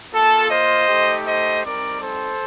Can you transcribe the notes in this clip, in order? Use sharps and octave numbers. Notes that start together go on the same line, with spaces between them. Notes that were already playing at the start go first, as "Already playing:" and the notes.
A#3 F4 A4
C5 D#5
A3 D#4 G4
C5 D#5
G3 C4 D#4 A#4 D5
A4 C5